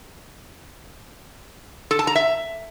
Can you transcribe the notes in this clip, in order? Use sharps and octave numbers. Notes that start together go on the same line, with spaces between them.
A4
A5
A#5
E5